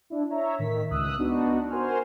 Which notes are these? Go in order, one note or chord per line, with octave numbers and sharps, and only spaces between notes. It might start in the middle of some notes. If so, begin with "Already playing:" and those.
D4 E4
C#5 E5 A#5
A2 D#3 B6
C#2 D#6 E6 F#6
B3 D4 D#4 F#4
F#4 A#4 C5 G#5 F6